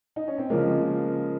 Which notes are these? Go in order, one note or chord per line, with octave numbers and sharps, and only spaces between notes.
D#4
C#4
C4
C#3 F3 G#3 A#3